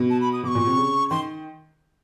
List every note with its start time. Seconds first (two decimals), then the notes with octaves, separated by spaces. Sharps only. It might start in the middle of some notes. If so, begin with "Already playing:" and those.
Already playing: B2
0.10 A5
0.21 B5
0.33 D#6
0.43 B2 D6
0.48 C#6
0.55 A#2
0.67 C3
0.77 C#3
1.10 D#3 C6